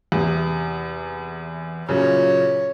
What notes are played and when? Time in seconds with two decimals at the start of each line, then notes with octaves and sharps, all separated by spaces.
0.12 E2 C3
1.89 F#2 A#2 C#3 C#5